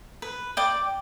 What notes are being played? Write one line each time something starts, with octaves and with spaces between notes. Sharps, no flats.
B4
D5 G5 D6